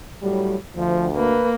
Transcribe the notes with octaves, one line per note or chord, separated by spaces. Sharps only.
A2 F#3 G3
D2 F3
A#3 B4